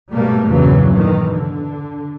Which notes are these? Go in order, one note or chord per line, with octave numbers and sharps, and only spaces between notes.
G#2 B2 G3 A3 A#3
E2 G2 A#2 C#3 E3 F#3
D#3 E3
D3